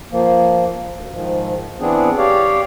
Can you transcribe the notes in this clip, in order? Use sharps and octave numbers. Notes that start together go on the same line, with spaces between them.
F3 A#3
D2
G#2 D#3 F3
E3 B3 C4 D4 G#4
G4 C#5 D5 F5